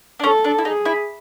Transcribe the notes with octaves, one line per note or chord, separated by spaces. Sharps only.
D4
C#4 A4
D4
E4
D#4 G#4
E4